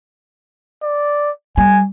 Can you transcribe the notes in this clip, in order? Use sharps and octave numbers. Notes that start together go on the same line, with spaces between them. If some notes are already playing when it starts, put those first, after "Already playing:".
D5
G3 G#5